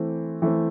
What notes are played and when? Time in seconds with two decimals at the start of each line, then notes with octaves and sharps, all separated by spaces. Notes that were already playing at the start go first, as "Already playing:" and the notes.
Already playing: E3 A3 C4
0.42 E3 A3 C4